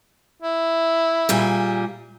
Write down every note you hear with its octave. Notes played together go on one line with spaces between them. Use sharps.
E4
A#2 G3 G#4